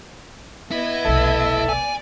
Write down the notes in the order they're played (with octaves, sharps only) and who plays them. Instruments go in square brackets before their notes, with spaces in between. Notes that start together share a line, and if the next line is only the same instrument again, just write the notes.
[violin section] B3 D#5 G#6 [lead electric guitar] E4
[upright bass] F1 B1 [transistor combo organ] A4 E5
[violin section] D5 [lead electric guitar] G#5